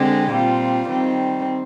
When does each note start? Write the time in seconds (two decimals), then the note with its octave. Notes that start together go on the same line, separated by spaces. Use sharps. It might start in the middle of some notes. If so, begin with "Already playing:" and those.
Already playing: D3 G#3 C4 G4
0.32 A#2 G3 C4 F4
0.90 D#3 G3 C4